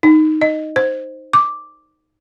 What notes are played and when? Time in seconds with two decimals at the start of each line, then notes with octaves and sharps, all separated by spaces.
0.03 D#4
0.41 D#5
0.76 C5
1.33 D6